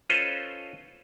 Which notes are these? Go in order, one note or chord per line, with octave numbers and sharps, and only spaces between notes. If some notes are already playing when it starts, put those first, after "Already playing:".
C#4 F4 A4 B4 C5 D#5